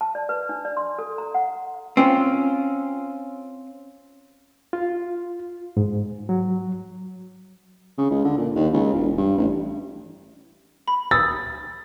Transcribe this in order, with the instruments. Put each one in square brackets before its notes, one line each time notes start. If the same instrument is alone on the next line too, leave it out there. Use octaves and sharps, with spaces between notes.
[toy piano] A5
D5
B4
D4
D5
C6
A4
A#5
F#5
[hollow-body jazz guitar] C4 C#4 F4
[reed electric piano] F4
G#2
F#3
[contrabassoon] C#3
C#2
D3
A#2
D#2
C#2
E1
G2
A1
[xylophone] B5
[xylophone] D#6 E6 [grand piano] A6